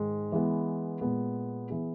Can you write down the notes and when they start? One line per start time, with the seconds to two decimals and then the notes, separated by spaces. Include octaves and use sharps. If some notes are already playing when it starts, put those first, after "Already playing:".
Already playing: G#2 D#3 G#3
0.32 E3 G#3 B3
1.01 A#2 G#3 B3
1.70 E3 B3 E4 G#4